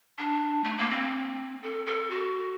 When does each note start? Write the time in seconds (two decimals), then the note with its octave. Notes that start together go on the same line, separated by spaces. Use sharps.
0.18 D4
0.64 A3
0.78 A#3
0.91 C4
1.62 A4
1.86 A4
2.10 F#4